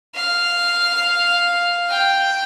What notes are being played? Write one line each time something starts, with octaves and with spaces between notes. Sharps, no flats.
F5
G5